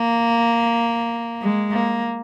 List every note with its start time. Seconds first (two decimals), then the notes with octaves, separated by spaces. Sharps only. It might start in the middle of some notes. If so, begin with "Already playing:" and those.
Already playing: A#3
1.42 G#3
1.72 A#3